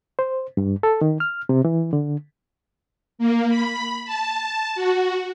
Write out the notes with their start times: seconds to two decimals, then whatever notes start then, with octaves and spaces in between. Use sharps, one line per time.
0.19 C5
0.57 G2
0.83 A4
1.01 D#3
1.20 F6
1.49 C3
1.65 E3
1.93 D3
3.19 A#3
3.49 B5
4.05 A5
4.75 F#4